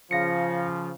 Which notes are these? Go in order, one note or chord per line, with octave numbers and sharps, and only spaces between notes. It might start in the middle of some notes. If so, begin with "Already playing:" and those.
C#3 F3 F5 A#6 C#7